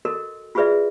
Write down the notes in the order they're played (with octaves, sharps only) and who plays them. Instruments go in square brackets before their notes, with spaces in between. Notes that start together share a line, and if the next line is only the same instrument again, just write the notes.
[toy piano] F#4 A4 A#4 D#5
F4 F#4 G#4 B4 D5 E5